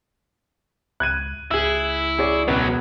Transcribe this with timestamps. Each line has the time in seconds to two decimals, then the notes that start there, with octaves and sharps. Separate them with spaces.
1.00 C#2 F#6 G#6 D#7
1.51 C#2 E4 G#4 E6
2.18 G#4 C#5 D5
2.48 E1 B2 F#3 B3